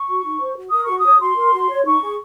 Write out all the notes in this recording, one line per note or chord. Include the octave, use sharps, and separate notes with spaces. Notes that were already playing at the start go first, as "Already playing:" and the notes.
Already playing: C#6
F#4
D#4
C5
F#4
A#4 D#6
C#6
F#4
D#6
C#5
F#4 C6
A#4
F#4
C#5
D#4 C#6
G#4